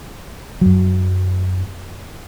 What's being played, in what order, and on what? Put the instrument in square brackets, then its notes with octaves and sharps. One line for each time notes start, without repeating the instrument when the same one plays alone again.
[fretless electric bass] F#2 F#3